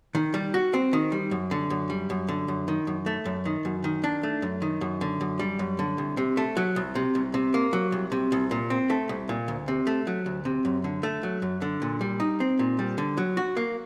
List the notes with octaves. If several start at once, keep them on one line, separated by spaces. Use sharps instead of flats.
D#3
G3
F#4
C4
D#3
G3
F#2
D3
F#2
G3
F#2
D3
F#2
D#3
F#2
A3
F#2
D#3
F#2
D#3
D4
A3
F#2
D#3
F#2
D3
F#2
G3
F#2
D3
C2
C3
A3
F#3
C2
C3
C2
C3
A#3
F#3
C2
C3
C2
A#2
C4
A3
C2
A#2
D2
C3
A3
F#3
D2
C3
F#2
D3
A3
F#3
F#2
D3
A#2
G3
D#4
C4
A#2
G3
D3
F#3
F#4
A#3